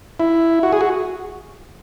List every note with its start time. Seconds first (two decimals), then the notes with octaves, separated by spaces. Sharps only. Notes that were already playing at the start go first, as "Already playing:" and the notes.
0.20 E4
0.63 F#4
0.72 G#4
0.81 F#4